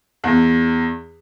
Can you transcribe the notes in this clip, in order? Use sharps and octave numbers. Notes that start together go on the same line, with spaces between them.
E2